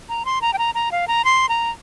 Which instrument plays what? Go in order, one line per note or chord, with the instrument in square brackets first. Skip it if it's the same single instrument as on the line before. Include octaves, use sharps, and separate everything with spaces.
[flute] A#5
C6
A#5
G5
A#5
A#5
F5
A#5
C6
A#5